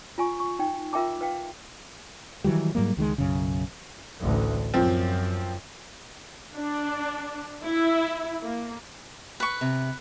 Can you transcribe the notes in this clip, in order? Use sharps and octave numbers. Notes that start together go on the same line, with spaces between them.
F4 G#5 C#6
C#6
D#4 G5
F4 A#4 E5 G5 A5 D6
B4 F5 G5
D#3 E3 F#3 G3
G#2 F#3 G3 A#3
C#2 D#3 F#3 G#3
B1 F#2 C#3
A1 D2
F#2 F3 C4
D4
E4
A#3
B4 C#6
C3